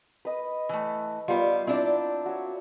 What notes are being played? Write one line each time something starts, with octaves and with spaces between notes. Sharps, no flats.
B4 D#5 B5
E3 A3
G3 B3 F4 A#4 B5
C4 D4 E4 D5
F#4 C#5